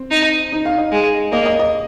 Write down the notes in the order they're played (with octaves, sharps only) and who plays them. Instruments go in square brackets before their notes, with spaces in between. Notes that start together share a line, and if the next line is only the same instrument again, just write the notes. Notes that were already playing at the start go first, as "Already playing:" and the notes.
Already playing: [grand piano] C4
[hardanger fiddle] D#4
[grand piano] D#4
F5
D#5
[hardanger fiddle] G#3
[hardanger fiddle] A#3 [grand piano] D#5
[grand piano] D#5
D#5